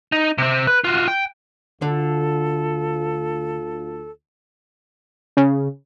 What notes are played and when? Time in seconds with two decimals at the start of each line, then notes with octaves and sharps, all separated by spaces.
0.12 D#4
0.38 C3 C4
0.67 B4
0.84 F4 F#4
1.08 G5
1.82 D2 D3 F4 A4
5.37 C#3